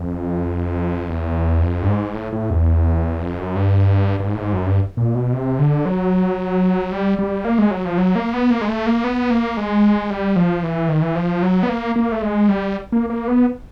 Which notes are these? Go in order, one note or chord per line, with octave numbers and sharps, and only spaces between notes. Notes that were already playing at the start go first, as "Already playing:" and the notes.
Already playing: F2
E2
F2
G2
G#2
A2
A2
E2
F2
F#2
G2
G2
G#2
A2
G#2
F#2
G2
A#2
B2
C3
D3
F#3
G3
G3
A#3
G#3
F#3
F3
F#3
A#3
B3
A#3
G#3
A3
A#3
B3
A#3
G#3
G3
F3
E3
D#3
E3
F3
F#3
B3
A#3
A#3
A3
G#3
G3
A#3
A#3
B3